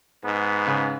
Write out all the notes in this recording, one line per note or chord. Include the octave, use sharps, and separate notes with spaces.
G#2 B3
C#3